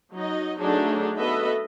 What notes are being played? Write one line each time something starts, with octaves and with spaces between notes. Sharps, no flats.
F#3 D#4 D#5
F#3 A3 D4 D#4 G#4
B3 F#4 A4 B4 D#5 E5